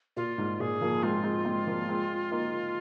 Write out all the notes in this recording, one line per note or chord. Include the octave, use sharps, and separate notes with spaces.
A#2 F4
G#2
A#2 G#4
F3 A#3
G#3 C4 F4
G#3 C4
G#3 C4
F3 A#3
G#3 C4
A#3 D#4